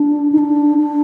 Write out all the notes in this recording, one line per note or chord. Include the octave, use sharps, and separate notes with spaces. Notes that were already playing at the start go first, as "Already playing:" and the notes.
Already playing: D4
D#4
D4
D4